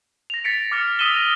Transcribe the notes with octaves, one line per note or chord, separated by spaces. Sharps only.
A#6 F7
A6 B6 C#7 D7
D6 F6 A6 C#7
D#6 E6 B6 D#7 E7 G7
A#6